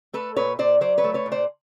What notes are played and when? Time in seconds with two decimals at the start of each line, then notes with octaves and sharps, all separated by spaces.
0.13 A3 A4 B4
0.36 A#2 B4 C#5
0.59 A#2 C5 D5
0.81 F#3 C5 D5
0.98 B4 C#5
1.04 A3
1.14 B4 C#5
1.26 A#2
1.32 C5 D5